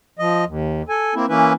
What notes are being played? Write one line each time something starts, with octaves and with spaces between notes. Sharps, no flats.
F3 D#5
D#2
A4 G#5
A#3 C4 E4
E3 A#3 C#4 E4 B4